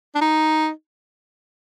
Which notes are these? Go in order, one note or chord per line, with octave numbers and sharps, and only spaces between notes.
D4
D#4